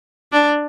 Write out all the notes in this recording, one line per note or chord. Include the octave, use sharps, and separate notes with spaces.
D4